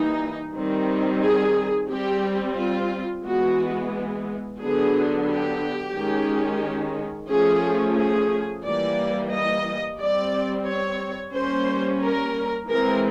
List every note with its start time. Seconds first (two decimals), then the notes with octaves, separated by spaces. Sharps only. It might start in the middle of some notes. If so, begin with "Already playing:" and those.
Already playing: E3 G3 A#3 D#4
0.55 D#3 G3 C4
1.23 G#4
1.91 G3 C4 G4
2.57 F4
3.25 E3 G#3 B3 F#4
4.60 D3 F#3 B3 D4 G#4
5.28 G4
5.96 D#3 G#3 C#4
7.30 F3 A3 C#4 G#4
7.97 G#4
8.65 E3 G3 A#3 D5
9.32 D#5
9.99 G3 C4 D5
10.67 C#5
11.35 G3 A#3 C#4 C5
12.02 A#4
12.69 E3 G#3 C4 A#4